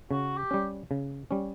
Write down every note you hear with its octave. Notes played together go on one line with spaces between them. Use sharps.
C#3 F#4
G4
G3 C#4
C#3
G3 C#4